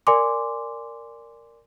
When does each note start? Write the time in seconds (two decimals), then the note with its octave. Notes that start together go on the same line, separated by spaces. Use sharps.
0.07 A#4 D5 G#5 C6 D6